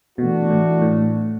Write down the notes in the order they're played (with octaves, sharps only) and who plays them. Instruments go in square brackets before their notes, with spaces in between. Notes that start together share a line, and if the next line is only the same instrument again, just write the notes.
[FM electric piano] B2 [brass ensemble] E3 A3 D4 F#4
[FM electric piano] A2
A2